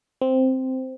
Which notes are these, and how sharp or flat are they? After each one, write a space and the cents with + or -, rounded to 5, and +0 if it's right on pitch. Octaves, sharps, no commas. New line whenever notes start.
C4 -5